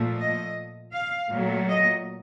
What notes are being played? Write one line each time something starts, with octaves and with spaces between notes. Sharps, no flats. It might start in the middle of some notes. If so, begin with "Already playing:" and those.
Already playing: A#2 F3 A3
D#5
F5
A#2 F#3 A3
D#5